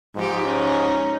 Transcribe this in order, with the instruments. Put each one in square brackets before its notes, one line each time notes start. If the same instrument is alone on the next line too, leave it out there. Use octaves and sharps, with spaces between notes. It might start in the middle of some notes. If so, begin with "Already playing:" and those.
[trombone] G#2 [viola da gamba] F3 D#4 G4
[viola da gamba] C#4 [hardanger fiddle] D#4